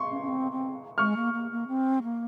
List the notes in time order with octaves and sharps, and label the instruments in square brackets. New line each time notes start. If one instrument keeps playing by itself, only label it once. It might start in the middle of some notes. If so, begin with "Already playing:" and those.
Already playing: [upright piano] C6 C#6
[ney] C#4
C#4
C4
C4
[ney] G#3 [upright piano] C#6 F6
[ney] A#3
A#3
A#3
C4
A#3